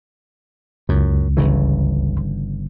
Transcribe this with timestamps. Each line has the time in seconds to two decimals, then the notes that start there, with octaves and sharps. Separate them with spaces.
0.89 C#2 F#2
1.37 G1 C#3 E3